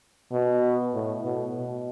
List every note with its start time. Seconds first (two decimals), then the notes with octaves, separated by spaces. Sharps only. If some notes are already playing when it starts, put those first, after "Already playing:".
0.32 B2
0.94 A2
1.24 B2
1.56 B2